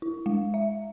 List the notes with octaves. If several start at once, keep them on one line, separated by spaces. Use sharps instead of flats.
E4
G#3
E5